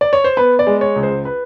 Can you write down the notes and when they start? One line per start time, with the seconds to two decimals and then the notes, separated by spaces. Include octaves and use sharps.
0.01 D5
0.13 C#5
0.24 C5
0.37 B3 B4
0.59 D5
0.67 G#3
0.81 C#5
0.96 C#2
1.03 C5
1.25 B4